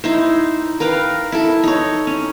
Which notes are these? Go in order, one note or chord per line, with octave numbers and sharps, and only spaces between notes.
D#4 E4 C5
A#4 B4 F5 G5
E4 A4
D#4 C#5
C#4